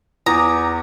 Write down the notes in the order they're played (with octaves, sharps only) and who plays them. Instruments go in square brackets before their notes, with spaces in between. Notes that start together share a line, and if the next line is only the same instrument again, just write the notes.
[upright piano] E2 [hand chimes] G#5 D6 D#6 [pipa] A#5